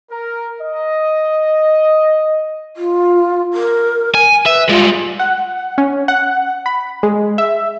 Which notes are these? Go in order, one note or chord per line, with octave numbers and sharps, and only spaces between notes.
A#4
D#5
F4
A#4
G#5
B4 E5
G3 G#3 F4
F#5
C#4
F#5
B5
G#3
E5